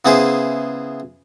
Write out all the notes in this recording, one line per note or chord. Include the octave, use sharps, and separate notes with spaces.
C#3 B3 E4 G#4 C5